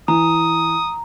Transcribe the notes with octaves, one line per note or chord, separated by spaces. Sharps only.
E3 A#5 D#6